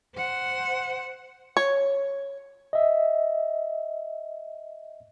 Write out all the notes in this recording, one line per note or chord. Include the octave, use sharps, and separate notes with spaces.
C5 F#5
C#5
D#5 E5